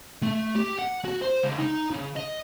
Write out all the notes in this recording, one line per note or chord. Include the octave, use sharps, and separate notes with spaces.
A3
G4
F#5
F#4
C5
C#2
D#4
C#3
D#5